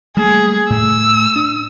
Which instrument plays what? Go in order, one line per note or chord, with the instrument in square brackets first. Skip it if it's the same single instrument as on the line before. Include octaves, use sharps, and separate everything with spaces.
[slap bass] G3 A3 A#3 [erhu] G#4
[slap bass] A2 A3 [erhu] E6
[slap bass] D4